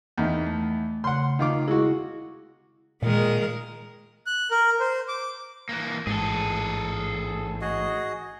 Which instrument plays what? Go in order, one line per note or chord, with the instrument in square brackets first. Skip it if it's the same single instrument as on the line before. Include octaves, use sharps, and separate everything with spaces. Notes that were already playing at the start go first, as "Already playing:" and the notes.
[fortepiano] E2 D#3
[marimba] A3
[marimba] C#3 [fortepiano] F#5 C6
[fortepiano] D#3 F4 D6
[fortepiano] G#3 F#4 [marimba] E4
[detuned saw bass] A#2 [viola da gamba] D#3 G#3 A#4
[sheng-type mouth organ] F#6
A#4
C5
D6
[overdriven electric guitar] E3 A#3
[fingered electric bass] A1 G#2 [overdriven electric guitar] G#4 A4
[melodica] F#4 G#4 D#5